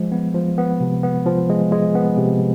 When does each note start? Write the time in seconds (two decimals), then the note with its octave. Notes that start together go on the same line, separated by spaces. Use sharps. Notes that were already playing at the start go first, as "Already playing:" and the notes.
Already playing: F3 G#3
0.12 B3
0.34 F3
0.58 B3
0.80 C3
1.03 B3
1.26 F3
1.49 G#3
1.72 G#3
1.95 B3
2.17 C3